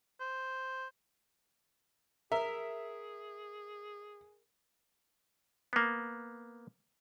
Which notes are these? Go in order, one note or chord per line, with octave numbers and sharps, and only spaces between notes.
C5
G#4 A#4 E5
A#3 B3